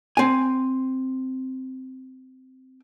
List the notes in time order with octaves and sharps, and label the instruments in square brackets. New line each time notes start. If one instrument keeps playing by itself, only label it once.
[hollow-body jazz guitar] C4 G#5